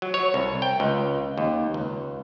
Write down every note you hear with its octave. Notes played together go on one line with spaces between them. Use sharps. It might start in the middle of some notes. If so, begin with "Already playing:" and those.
F#3
C#5
C2
G5
C#2
D#2
C#2